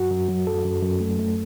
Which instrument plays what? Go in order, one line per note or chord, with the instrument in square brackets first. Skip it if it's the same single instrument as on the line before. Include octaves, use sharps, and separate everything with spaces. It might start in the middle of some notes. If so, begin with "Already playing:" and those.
Already playing: [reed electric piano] F#2 F#4
F#2
F#3
F#2 A4
F#2
F#2
A3
A3